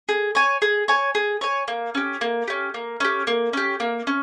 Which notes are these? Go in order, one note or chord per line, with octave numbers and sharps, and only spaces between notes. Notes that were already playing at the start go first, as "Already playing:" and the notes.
G#4
C#5 G#5
G#4
C#5 G#5
G#4
C#5 G#5
A#3
C#4 G4
A#3
C#4 G4
A#3
C#4 G4
A#3
C#4 G4
A#3
C#4